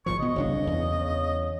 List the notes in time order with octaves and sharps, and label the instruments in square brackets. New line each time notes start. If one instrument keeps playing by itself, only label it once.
[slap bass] G#1 A#2 F3 [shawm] C#6
[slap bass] B2 B3 [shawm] D#5
[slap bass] F#1 C2 D4 [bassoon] C#3
[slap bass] E2